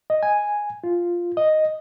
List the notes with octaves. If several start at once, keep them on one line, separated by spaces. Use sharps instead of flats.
D#5
G#5
F4
D#5